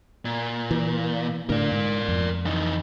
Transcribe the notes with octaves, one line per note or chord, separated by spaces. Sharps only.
A#2
E3
A2 D3 A#4 D5
G#2
F2
E3 D#4